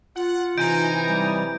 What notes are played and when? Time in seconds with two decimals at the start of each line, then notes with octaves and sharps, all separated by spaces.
0.16 F4 F#5
0.58 C3 E3 D#4 G#5 A#5 G6 D7
1.08 G3